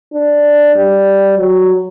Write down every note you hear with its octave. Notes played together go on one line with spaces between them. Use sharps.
D4
G3
F#3